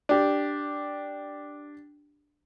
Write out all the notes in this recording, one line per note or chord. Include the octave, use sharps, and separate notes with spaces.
D4 G4